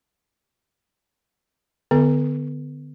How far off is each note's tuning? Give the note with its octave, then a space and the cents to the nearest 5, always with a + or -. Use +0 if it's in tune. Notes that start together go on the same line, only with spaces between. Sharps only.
D3 +10 B3 +25 A4 +0